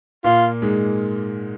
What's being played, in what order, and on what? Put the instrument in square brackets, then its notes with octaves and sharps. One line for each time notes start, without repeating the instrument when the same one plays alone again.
[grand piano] A#2 A#3 [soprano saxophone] F4
[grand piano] G#2 G#3